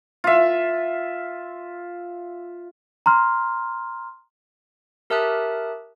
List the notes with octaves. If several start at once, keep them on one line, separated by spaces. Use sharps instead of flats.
F4 E5
A#5 C6 F6
G4 A#4 E5 A5 D#6 F#6